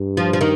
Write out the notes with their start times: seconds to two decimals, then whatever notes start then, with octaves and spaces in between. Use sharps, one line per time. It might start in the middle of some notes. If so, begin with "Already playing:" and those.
Already playing: G2
0.17 F3
0.33 F3
0.41 D#3